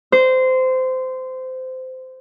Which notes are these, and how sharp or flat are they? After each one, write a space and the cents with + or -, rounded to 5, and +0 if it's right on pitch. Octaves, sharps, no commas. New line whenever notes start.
C5 -20